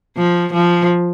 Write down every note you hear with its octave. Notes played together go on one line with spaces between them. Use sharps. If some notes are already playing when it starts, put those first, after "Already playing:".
F3
F3